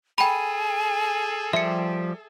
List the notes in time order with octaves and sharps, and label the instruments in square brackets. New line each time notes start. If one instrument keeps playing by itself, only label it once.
[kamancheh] G#4 A4 [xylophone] G5 B5 [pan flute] G#5
[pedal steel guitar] F3 G3 G4 [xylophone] E5 C#7